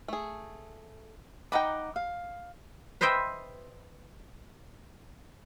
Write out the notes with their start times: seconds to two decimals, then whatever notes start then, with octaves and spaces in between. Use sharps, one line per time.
0.08 A3 G#4
1.52 D#4 F#5 G5 A#5 B5 D6
1.96 F5
3.01 B4 C5 D#5 E5 G5